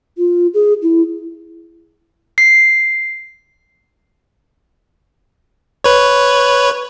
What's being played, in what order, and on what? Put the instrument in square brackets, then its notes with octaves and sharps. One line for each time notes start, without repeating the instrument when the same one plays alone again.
[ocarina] F4
G#4
E4
[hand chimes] C7
[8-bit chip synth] B4 C#5